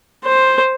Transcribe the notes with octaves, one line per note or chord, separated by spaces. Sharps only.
C5